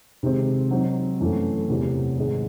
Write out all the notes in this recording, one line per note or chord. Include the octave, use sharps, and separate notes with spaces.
C3 D#3 G#3 C4
F#3 C4 D#4
F#2 E3 A3
E2 C3 E3 C4
G#2 D#3 G#3